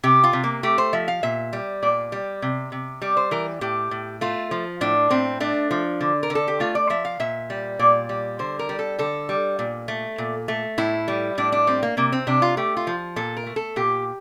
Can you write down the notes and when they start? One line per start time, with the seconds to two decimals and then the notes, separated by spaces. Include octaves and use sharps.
0.03 C3 G4
0.24 F4
0.33 C3
0.44 A#3
0.63 A3 G4
0.78 C5
0.93 F3 E5
1.08 F5
1.23 A#2 E5
1.53 G3
1.82 A#2 D5
2.12 G3
2.42 C3
2.72 C3
3.02 G3 D5
3.17 C5
3.31 E3 A#4
3.61 A2 G4
3.91 A2
4.21 A3 F4
4.51 F3
4.81 A2 D4
5.10 A2 C4
5.40 A3 D4
5.71 F3
6.01 D3
6.23 A#4
6.30 D3
6.35 A4
6.48 G4
6.60 A3 F4
6.75 D5
6.90 F3 E5
7.05 F5
7.20 A#2 E5
7.50 G3
7.79 A#2 D5
8.09 G3
8.39 D3 C5
8.59 A#4
8.69 G3
8.79 A4
8.99 D3 A4
9.29 G3
9.59 A#2
9.88 A3
10.18 A#2
10.48 A3
10.78 A2 E4
11.08 G3
11.38 A2 D4
11.52 D4
11.67 G3 C4
11.83 A#3
11.97 C3 A#3
12.12 C4
12.27 C3 D4
12.42 F4
12.57 A3 G4
12.77 F4
12.87 F3
13.16 A#2 A4
13.37 A#4
13.46 A3
13.56 A4
13.76 A#2 G4